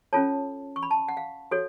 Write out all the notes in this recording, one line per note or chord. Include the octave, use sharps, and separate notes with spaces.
C#4 F4 A4 C#5 A5
C#6
B5
A5
F#5
F5
F#4 A4 C#5